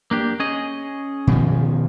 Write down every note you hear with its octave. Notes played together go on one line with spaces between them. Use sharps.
A#3 D4 G4
C#4 G#4 D#5
B2 D#3 F3